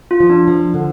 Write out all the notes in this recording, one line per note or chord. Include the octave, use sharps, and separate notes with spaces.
F4
F3
D4
F3
D3